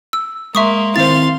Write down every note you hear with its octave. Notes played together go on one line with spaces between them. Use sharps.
E6
G#3 A#3 E5 C6 C#6 D#6
D#3 C4 E4 C5 F5 C6 A6